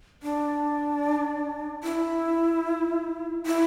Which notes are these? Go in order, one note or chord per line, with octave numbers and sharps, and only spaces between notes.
D4
E4
E4